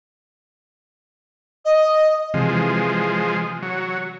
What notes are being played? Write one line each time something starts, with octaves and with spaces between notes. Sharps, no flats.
D#5
C3 E3 F3 G#3
F#3